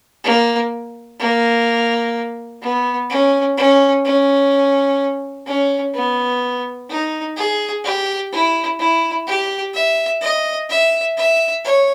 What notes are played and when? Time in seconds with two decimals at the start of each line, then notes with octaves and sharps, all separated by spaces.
0.24 A#3
1.19 A#3
2.62 B3
3.09 C#4
3.57 C#4
4.05 C#4
5.46 C#4
5.94 B3
6.89 D#4
7.36 G#4
7.84 G4
8.32 E4
8.79 E4
9.26 G4
9.74 E5
10.21 D#5
10.69 E5
11.17 E5
11.64 C#5